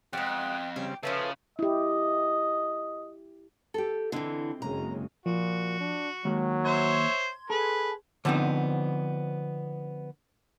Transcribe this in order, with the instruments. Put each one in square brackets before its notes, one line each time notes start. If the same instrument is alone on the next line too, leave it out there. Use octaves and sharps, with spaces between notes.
[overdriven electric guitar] F2 [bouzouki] G3 G#3 [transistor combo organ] F#5 [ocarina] G5
[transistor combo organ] C#3 G3 C4 [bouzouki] G4
[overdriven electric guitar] C#3 [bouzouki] F3 C#4 E4 [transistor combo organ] A4 [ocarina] B4
[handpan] E4 G4 [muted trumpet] D#5
[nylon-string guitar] G4 A4
[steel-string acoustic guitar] D3 E3 [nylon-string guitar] C4 E4 D#5
[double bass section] F#1 C#3 G#3 [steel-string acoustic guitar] A#5
[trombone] A#2 [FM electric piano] F3 [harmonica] F#4
[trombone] D4
[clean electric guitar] D#2 [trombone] F#3 [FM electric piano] G#3
[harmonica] C5 C#5 E5 [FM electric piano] C6 G#6
[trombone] G#4 [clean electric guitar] A4 [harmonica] B4
[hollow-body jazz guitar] D3 F3 B3 C4 D#4